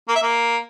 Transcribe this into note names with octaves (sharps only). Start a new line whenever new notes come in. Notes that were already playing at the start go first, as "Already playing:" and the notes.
A#3
E5
A#3